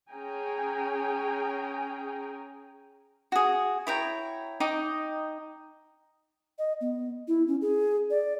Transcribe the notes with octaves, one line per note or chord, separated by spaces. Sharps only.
C#4 G#4 G5 G#5 A#5
F#4 G#4
E4 C#5 G5 A#5
D#4 D#5 G5 D6
D#5
B3
E4
C#4
G#4
D5